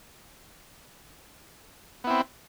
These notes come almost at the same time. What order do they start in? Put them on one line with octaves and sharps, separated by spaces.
B3 E4 C4